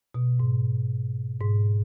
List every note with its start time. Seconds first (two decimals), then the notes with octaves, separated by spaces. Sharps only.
0.14 B2
0.40 G#2
1.40 G#2